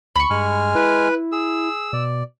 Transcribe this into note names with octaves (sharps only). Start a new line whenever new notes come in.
D2 B5 C#6
G2 G#3 G#5 F6
E4 B4
G#4 E6
B2 D5